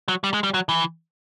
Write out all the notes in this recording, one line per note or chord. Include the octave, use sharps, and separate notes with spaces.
F#3
G3
G#3
G3
F#3
E3